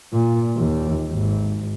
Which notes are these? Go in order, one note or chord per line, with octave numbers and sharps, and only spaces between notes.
A#2
D#2
G#1